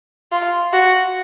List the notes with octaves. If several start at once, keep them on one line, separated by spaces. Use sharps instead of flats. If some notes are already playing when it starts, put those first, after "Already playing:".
F4
F#4